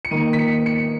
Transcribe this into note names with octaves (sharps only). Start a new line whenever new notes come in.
C#7
D#3 A#3 D#4 D#7
B6
C#7
C#7